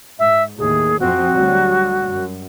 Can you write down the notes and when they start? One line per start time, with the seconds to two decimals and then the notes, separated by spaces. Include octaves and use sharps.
0.19 G#2 E5
0.58 D#2 A2 G#4
1.00 F2 F3 C4 F#4
1.34 D2 F#3 G3
2.07 F#2